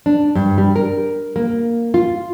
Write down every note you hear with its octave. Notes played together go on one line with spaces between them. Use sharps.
D4
G2
G3
A#4
A#3
F4